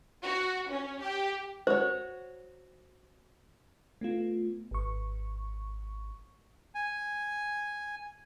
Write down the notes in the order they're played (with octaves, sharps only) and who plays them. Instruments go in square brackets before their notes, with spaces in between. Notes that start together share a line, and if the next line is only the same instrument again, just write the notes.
[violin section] F#4
C#4
G4
[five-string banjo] F#4 C#5 [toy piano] C5
[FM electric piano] A3 B3 F4
G#1 C#6
[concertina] G#5